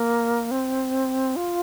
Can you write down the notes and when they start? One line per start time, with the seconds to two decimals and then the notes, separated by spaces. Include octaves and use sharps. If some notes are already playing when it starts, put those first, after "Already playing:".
Already playing: A#3
0.51 C4
1.36 F4